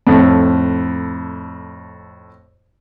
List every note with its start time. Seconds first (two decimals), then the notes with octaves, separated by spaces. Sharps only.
0.07 F2 A2